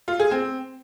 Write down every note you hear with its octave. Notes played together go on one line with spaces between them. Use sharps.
F4
G#4
C4